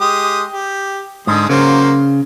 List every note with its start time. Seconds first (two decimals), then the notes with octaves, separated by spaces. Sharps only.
0.01 G#3 G4 D#6
0.52 G4
1.27 G#2 D3 G#3 D#6
1.49 C#3 F#3 A#3 C5